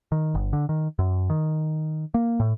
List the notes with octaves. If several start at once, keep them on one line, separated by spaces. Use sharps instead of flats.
D#3
G1
D3
D#3
F#2
D#3
A#3
A2